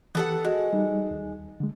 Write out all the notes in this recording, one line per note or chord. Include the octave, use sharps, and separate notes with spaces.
E3 B3 G4 A4 F#5
G#3 F#4
G3 D#4
D#2
D3 G#3